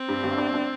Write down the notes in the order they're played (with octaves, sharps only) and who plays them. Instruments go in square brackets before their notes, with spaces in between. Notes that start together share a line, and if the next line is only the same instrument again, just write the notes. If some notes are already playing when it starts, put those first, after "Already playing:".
Already playing: [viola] C4
[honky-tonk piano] G2
G1
D4
D4